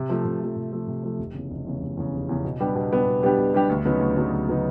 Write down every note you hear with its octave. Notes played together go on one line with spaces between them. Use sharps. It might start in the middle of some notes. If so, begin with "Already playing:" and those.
Already playing: C3
F3 A3
C3
F3 A3
C3
F3 A3
C3
F3 A3
F1
E2 C#3
F1
E2 C#3
F1
E2 C#3
F1
E2 C#3
B2
G3 B3 D4 G4
B2
G3 B3 D4 G4
B2
G3 B3 D4 G4
B2
G3 B3 D4 G4
D2
C#3 F#3 B3 D#4
D2
C#3 F#3 B3 D#4
D2
C#3 F#3 B3 D#4